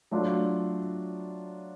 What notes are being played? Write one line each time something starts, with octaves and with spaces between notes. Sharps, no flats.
F#3 A3 D4 F4